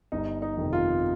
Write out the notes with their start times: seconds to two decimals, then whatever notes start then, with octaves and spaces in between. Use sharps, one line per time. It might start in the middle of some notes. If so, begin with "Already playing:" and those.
0.12 G1 D#4
0.42 D#4
0.57 F2 C3 D#3
0.73 F4